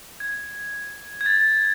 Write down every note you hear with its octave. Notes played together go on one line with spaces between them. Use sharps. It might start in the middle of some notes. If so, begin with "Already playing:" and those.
G#6
G#6
A6